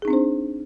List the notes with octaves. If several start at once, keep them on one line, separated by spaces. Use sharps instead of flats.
C4 D4 D#4 G#4 C5